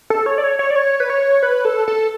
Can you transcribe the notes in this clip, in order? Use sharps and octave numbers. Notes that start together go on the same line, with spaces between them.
A4
C#5
D5
C#5
C#5
D5
C#5
B4
C#5
B4
A4
A4